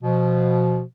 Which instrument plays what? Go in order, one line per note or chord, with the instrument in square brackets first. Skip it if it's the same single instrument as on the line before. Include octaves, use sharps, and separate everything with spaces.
[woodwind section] B2 F3